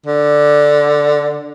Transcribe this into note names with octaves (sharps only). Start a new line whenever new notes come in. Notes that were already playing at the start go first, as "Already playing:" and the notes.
D3